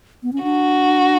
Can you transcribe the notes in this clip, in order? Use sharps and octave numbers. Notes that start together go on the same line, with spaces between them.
B3
C#4
D4 F#4